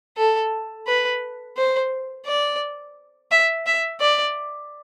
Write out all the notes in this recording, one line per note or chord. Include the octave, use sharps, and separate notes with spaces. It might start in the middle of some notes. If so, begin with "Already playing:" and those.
A4
B4
C5
D5
E5
E5
D5